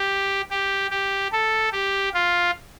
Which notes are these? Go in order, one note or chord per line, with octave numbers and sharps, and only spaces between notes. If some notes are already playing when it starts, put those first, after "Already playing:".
Already playing: G4
G4
G4
A4
G4
F4